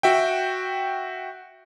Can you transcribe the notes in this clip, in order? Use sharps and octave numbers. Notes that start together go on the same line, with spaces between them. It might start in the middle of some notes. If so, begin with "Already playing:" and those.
F#4 E5 G5